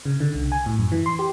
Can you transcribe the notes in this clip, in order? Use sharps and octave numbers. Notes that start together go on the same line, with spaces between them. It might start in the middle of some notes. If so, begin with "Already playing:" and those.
C#3
D3
C2
G#5
A2
F#2
E3
C6
G4